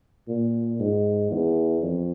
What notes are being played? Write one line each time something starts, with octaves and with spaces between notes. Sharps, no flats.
A#2
G#2
E2
F2